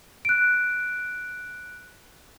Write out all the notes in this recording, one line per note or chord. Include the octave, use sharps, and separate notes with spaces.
F#6 D7